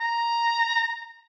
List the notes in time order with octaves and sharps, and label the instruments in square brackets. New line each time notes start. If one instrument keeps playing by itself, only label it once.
[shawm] A#5